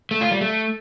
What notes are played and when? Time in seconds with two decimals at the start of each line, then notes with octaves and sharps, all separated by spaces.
0.11 A3
0.21 F4
0.31 G3
0.41 A3